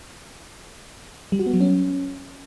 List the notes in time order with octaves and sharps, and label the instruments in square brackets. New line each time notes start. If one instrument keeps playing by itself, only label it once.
[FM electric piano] G3
F#4
B3
F#3
C#4